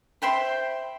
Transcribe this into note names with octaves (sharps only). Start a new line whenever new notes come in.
C5 E5 G5 B5